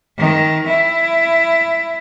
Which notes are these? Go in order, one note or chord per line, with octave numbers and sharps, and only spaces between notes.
D#3
E4